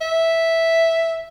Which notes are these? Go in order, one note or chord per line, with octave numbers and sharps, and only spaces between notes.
E5